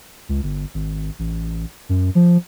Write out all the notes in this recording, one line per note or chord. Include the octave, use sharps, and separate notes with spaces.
C#2
G1
G#1
A1
F#2
F3